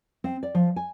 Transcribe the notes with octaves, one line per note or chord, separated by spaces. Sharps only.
C4
D5
F3
G#5